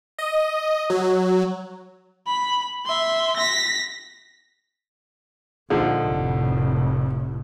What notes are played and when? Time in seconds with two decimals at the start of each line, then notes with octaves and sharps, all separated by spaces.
0.18 D#5
0.90 F#3
2.27 B5
2.86 E5 C6
3.37 A#6 B6
5.70 A#1 D3 F3 D#4
6.10 F1 A2